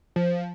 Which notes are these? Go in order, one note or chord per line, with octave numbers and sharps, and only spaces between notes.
F3